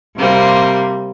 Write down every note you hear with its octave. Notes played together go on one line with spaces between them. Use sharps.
C3 G3 A#3 C4